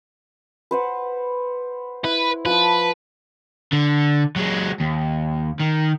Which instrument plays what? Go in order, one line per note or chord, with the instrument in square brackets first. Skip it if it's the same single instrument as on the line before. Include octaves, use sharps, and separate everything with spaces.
[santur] B4 C5 F#5
[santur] E4 [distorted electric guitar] B4
[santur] F3 A5 D#6 [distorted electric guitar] B4
[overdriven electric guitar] D3
F#3 G#3
D#2
D#3